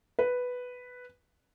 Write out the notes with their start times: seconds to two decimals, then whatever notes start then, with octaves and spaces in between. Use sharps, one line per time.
0.19 B4